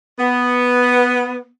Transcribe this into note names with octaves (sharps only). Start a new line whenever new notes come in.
B3